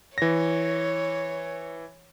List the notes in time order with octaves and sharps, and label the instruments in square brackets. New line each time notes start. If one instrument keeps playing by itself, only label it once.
[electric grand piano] E3 A#6 [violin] C#5